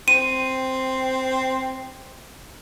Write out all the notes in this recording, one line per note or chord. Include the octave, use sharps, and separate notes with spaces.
C4 D#7